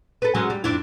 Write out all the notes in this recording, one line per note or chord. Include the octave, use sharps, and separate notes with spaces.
A4 B4
F#3 G#3 C#4
G3
F2 D4 E4